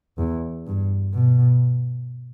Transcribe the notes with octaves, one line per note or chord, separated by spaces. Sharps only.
E2
G2
B2